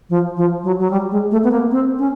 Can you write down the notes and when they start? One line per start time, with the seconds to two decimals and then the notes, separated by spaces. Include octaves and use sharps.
0.10 F3
0.37 F3
0.64 F#3
0.79 F#3
0.91 G3
1.11 G#3
1.32 A3
1.44 B3
1.51 A#3
1.71 C4
1.99 C#4